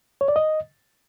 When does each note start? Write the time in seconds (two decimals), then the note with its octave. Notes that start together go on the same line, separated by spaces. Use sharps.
0.21 C#5
0.28 D5
0.36 D#5